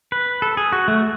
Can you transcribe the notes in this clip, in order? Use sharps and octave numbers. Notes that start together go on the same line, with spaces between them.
B4
A4
G#4
F#4
A3